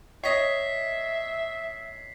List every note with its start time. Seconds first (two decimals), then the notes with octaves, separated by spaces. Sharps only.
0.24 C#5 D#5 E5 B6 C7